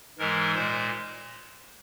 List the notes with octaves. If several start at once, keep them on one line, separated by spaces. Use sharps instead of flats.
G#2 E3 G#3 A#4
A#2 G#3 C5